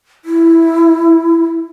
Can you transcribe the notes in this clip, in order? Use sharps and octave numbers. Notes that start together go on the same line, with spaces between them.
E4